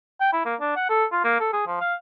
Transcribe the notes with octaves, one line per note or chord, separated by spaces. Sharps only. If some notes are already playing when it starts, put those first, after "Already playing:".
G5
E4
A#3
D4
F#5
A4
F4
A#3
A4
G#4
F3
F5